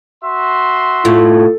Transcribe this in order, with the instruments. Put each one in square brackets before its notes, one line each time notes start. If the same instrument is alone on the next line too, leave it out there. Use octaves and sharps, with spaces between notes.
[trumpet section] F#4 E5 C6
[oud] A2 [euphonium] F4